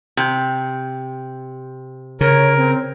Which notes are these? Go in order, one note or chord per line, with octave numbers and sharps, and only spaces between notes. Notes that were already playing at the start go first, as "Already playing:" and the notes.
C3
C#3 A#4 C#5
C4